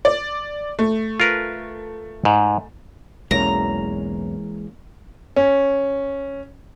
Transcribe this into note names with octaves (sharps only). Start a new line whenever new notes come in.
D5
A3
F4 A#4 B4
G#2
B1 E2 E3 G#3 A#3 C#4 A#5
C#4